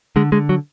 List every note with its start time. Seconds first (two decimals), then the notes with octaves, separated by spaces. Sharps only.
0.16 D3 G#3
0.32 D3 G#3
0.49 F#3